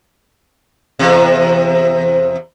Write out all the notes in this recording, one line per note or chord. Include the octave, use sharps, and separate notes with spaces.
E2 C3